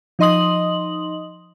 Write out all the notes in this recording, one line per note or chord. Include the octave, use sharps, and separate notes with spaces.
F3 D#4 D#5 C6 D#6 F#7